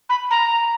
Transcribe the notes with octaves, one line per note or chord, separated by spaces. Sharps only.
B5
A#5